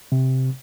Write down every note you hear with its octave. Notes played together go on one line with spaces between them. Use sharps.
C3